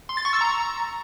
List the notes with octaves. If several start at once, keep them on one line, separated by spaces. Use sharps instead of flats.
C6
A6
C#6
E6
A#5